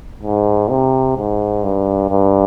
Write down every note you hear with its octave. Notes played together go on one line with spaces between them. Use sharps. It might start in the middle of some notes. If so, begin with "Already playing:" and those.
G#2
C3
G#2
G2
G2